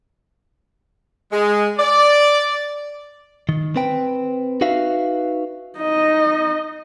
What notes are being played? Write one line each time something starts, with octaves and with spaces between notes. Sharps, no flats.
G#3
D5
D#3
C4 B4 G5
D#4 F#4 B4 E5 F5
D#4 D#5